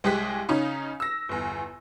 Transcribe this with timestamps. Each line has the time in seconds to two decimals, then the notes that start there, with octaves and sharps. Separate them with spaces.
0.04 C2 G#3 G4 G#4 F#6 B6
0.49 C#3 C#4 D#4
1.00 E6 A#6
1.29 G1 E2